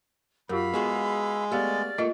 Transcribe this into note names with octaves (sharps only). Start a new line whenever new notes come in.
F#2 F4 G4 A#4 F5 B5 E6
G#3 B3 F#4 G#4
A3 B3 G4 D5 F5 F6
A3 A#3 F4 D#5